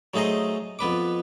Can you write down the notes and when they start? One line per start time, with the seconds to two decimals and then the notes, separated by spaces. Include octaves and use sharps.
0.14 F#3 A3 D#4 G#4 C5 D#5
0.79 F2 B3 B4 D6